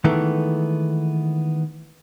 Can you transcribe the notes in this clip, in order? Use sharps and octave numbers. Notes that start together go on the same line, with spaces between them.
D#3 E3 G#3 A3 B3